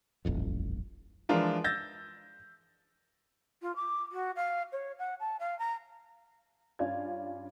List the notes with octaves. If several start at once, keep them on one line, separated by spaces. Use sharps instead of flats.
D#1 A1 F2
E3 F3 G#3 D4 F4 A#4
E6 G6 A6 A#6
F4
D6
F#4
F5
C#5
F#5
A5
F5
A#5
G2 C#4 F4 D5 F5 G#6